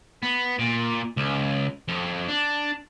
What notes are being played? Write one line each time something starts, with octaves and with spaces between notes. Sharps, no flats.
B3
A#2
C#2
F2
D4